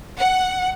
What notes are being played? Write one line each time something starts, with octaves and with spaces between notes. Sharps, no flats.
F#5